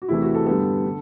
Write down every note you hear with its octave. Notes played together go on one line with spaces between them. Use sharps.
F#4
E2 C3 E3 A3 E4
F#4
A4
G2 D3 G3 B3 A4
D3